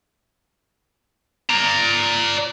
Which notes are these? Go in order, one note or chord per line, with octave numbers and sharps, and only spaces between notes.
D5 A#5